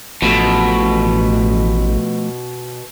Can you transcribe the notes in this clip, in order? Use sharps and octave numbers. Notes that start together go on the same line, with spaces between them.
A1 B2 F3 A3